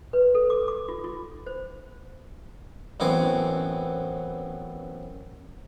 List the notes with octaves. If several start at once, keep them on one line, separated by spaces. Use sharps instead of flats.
B4
A4
D6
D6
F4
F4
C5
A1 F#2 B3 C4 G#5 D6